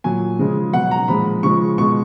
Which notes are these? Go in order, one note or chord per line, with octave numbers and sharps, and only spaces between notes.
A#2 F#3 G#5
C#3 F3 G#3
B2 F#3 F#5
A#5
A#2 F3 G#3 B5
C#3 F3 G#3 C#6
B2 G#3 C#6